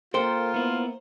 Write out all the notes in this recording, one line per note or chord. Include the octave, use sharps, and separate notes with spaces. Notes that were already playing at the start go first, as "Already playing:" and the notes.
A#3 F4 A4 A#4 C5 G5
B3 E4